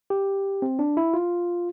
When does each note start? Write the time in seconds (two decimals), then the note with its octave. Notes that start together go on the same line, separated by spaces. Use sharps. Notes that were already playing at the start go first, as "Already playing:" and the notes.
0.10 G4
0.62 C4
0.79 D4
0.97 E4
1.14 F4